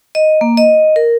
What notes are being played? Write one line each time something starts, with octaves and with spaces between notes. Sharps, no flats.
D#5
A#3
D#5
A#4